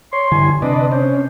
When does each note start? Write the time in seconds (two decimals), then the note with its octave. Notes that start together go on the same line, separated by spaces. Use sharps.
0.13 C#5 C6
0.32 G2 D3 E3 G#5
0.62 C3 C4 D4 B4 D5 D#5
0.92 C#4 C5